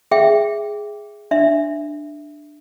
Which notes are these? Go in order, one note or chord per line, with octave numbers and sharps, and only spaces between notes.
G#4 E5 G5
D4 E5